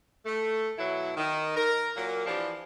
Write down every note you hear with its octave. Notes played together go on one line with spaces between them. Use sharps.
A3
B2 F#3 E4
D#3
A#4
A#2 F#3 A#3
E3 F3 D4 G4